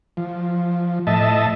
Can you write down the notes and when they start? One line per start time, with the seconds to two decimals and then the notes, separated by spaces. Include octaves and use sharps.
0.17 F3
1.07 A2 D#5 E5 A5